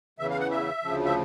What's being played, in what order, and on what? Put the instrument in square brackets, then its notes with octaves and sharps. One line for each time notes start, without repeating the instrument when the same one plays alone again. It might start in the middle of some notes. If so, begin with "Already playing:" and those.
[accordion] E2 C#3 E3 E5
F5
F#5
E5
D2 C#3 F3
E5